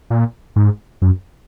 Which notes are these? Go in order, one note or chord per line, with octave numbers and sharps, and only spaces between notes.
A#2
G#2
F#2